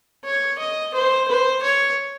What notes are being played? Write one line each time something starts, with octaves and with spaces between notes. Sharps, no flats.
C#5
D#5
C5
C5
C#5